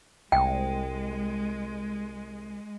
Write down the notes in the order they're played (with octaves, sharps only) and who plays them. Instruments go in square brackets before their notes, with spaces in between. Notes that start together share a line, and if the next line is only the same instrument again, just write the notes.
[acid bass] C2 [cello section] G#3 [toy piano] G5